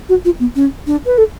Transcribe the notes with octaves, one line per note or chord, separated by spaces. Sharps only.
F#4
F4
B3
C#4
D4
B4
A4